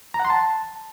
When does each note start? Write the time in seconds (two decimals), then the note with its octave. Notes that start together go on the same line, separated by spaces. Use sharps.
0.14 A#5
0.19 F#5
0.25 C6
0.30 A5